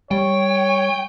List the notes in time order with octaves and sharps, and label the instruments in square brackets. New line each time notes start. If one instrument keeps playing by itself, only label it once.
[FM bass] G3 [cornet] C#5 [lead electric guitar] G5